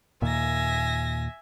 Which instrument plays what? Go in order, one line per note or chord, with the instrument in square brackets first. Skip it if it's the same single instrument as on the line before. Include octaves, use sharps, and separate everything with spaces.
[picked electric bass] D#2 A#2 [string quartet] E5 G#5 A#6